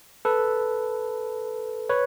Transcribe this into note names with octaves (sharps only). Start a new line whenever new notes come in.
A4 B4
B4 C#5